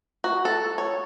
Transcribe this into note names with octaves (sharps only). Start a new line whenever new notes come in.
F#4
A4
C#5